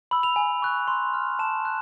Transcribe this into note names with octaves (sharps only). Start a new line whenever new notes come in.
B5 E6 F#7
F7
G#5
C#6 F#6
C6
F6
A5 E7
F#6